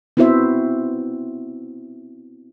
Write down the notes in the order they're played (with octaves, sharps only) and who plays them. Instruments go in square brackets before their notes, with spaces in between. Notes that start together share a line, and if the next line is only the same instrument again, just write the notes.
[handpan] B3 C4 E4 F#4 C5 E5